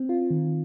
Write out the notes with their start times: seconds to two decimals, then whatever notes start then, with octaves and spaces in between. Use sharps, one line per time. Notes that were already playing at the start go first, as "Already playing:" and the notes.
Already playing: C4
0.09 F4
0.30 D#3